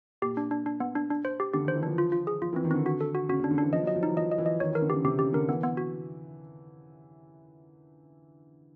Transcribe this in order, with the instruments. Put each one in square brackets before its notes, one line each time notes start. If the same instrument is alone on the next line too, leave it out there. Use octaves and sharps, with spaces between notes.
[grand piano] A#2 [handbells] G4
[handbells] D4
D4
D4
B3
D4
D4
C5
G4
[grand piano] D3 [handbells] G4
[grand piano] D#3 [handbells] C5
[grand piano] E3
[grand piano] F3 [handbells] D4
[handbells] F4
F4
G#4
[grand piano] F3 [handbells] F4
[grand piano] E3 [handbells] C4
[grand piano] D#3
[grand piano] D3 [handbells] C4
[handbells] F#4
A4
F#4
[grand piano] C#3 [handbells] F#4
[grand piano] C#3 [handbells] D4
[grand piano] D3
[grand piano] E3 [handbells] D4
[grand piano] F3 [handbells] D#5
[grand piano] F#3 [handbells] D#5
[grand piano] F3
[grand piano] E3 [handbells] D#4
[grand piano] F3 [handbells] D#5
[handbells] D#5
[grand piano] E3
[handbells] D#5
[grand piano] D#3 [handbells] C#5
[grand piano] E3 [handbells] A#4
[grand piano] D3
[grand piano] C#3 [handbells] G4
[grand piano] C3 [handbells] G4
[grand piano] C#3 [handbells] G4
[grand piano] D3 [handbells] A#4
[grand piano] E3 [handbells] B3
[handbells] B3
F#4